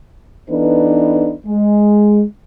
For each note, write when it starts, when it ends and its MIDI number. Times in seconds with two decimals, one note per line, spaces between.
0.50 1.34 52
0.50 1.34 59
0.50 1.34 62
0.50 1.34 63
0.50 1.34 69
0.50 1.34 71
1.46 2.23 56